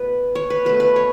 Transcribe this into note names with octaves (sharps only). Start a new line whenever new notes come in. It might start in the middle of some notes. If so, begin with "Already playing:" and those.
Already playing: B2 A3 B4
C#5
B4
B2 A3 B4
B4
C#5